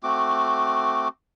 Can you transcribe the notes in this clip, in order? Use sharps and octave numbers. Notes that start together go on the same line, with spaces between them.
A3 C4 F#4 D6